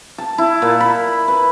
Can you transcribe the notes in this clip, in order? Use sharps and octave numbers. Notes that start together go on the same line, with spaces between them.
A5
E4
A#2
B5
B4